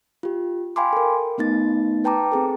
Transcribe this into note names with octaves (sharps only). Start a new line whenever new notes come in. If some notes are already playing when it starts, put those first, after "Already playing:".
F4 G4
F5 G5 G#5 B5 C6 D6
A4 A#4
A3 B3 D#4 A6
B4 G5 A5 A#5 D6
C4 G#4 A4